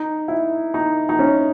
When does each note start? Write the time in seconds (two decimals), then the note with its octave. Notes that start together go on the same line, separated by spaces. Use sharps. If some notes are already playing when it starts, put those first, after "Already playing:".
Already playing: D#4
0.28 E4
0.74 D#4
1.09 D#4
1.19 C#4